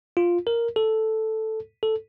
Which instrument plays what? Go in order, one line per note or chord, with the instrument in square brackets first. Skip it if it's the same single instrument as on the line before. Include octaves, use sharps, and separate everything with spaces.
[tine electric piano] F4
A#4
A4
A4